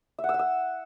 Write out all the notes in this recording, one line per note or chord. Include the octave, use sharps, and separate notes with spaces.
E5
F#5
E6
E5
E6